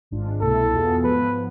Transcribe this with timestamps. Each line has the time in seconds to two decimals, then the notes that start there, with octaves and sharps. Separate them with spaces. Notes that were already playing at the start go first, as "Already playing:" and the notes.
0.11 G#1 G#2 G#3 D4 F4
0.41 C2 B2 A3 E4 A4
0.73 E2 B2 B3 F4 G#4
1.04 G#2 F3 B3 B4